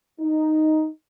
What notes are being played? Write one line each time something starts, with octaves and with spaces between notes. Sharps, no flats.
D#4